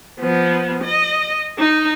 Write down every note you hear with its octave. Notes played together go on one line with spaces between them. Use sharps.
F3 B3
D#5
D#4